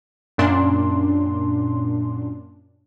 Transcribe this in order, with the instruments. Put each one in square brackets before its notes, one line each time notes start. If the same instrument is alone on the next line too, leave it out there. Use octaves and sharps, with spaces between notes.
[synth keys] F#2 A#2 C#4 D4 C6